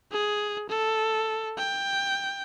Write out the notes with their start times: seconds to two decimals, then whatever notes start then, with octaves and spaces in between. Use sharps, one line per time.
0.12 G#4
0.69 A4
1.58 G5